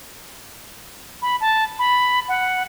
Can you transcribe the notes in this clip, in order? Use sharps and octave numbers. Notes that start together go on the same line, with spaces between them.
B5
A5
B5
F#5